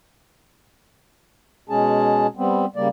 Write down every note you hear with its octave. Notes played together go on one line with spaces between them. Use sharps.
B2 G#3 C#4 G#4 A5
G3 B3 C4
C#3 G3 A#3 D5